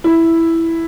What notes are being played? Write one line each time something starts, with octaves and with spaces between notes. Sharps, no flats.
E4